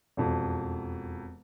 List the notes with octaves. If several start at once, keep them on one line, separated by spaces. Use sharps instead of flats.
E1 F2